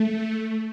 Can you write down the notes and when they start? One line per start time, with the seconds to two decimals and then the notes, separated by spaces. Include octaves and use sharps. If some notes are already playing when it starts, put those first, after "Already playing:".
Already playing: A3